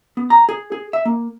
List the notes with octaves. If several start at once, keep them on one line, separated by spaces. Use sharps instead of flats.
B3
A#5
G#4
G#4
E5
A#3